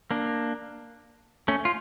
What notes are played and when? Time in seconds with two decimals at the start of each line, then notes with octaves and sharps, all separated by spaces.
0.11 A#3 D4
1.48 A3 C#4
1.65 F4